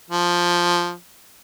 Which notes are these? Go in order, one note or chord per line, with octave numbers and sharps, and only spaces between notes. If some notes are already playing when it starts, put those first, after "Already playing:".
F3